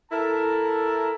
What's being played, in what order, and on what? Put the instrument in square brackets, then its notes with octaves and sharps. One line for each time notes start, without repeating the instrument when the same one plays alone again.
[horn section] E4 A4 A#4 E5 A5 A#5